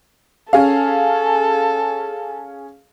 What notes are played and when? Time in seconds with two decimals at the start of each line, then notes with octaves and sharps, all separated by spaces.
0.53 C#4 G#4 A4 F5